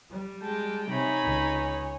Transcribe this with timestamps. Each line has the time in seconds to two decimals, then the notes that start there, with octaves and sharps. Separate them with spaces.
0.11 G3
0.43 G#3 G5 A5
0.90 C3 D#4 C#5 G#5 B5
1.22 C#2